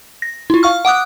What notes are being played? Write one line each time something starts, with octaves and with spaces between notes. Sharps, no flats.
A#6
E4 F4
F5 C#6 F6
F#5 D6 D#6 F#6